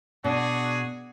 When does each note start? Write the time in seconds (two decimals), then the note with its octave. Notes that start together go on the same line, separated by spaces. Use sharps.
0.24 B2 D4 F#4 G#4